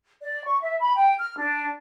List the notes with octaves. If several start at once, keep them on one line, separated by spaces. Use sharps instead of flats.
D5
C#6
E5
B5
G5
F6
D4